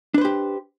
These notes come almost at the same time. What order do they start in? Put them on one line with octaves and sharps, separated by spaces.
D4 B4 C5 G4